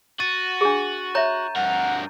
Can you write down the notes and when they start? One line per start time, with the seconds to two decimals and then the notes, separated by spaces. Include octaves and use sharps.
0.20 F#4 C#6 A6 D#7
0.61 D4 G#4
1.15 C#5 E5 A#5 G6
1.56 G2 A#4 F#5